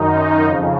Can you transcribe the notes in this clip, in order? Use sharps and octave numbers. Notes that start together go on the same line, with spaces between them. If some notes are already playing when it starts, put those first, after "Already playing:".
Already playing: F#2 D#3 D#4
F2 C#3